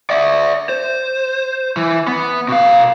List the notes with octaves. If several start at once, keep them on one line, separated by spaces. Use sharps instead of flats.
D5 E5
C5
E3
B3
B2 F5